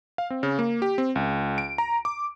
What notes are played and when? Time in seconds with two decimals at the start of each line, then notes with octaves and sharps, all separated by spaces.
0.18 F5
0.30 C4
0.43 C#3
0.59 A#3
0.82 G4
0.98 C4
1.16 C#2
1.58 D7
1.78 A#5
2.05 D6